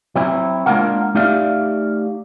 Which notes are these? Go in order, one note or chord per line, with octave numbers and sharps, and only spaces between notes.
F#3 C4 E4
G#3 A#3 D4 F4 A#4 F#5
A3 D#4 G4 D5 E5 F5